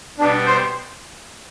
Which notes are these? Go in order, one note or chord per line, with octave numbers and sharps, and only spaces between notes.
B2 G3 B3 D4
C5